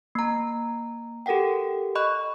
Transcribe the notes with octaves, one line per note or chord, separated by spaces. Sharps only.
A#3 A#5
G4 A4 A#4 F#5 G5
D#5 B5 C#6 F#6